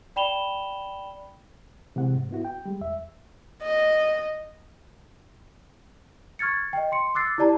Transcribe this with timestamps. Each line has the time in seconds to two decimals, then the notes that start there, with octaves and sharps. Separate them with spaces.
0.16 D5 G5 B5 E7 F7 G7
1.96 C3 E3 G#3 F#5
2.15 G#2
2.31 B3 E4 F#4
2.45 G5
2.66 G3 G#3
2.81 E2 E5
3.63 D#5
6.39 C#6 F6 G#6 A6 C#7
6.73 D#5 G5
6.92 C6 C#7
7.15 D6 E6 F#6 A6 C7
7.38 E4 G4 D5 A5 A#5